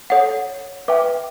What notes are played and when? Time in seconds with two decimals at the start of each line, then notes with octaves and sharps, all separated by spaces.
0.10 A4 C#5 F#5
0.88 B4 E5 G5 D6